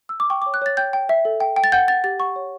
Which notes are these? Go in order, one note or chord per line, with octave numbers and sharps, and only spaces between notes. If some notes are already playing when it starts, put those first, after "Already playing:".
E6
D6
G5 C#6
D6
C#5
F#6
C#5 A6
G5 G6
G5
E5
A4
G5
G5
A6
F#5 G6
F#5 A6
G4 A6
F#5 C#6
C#5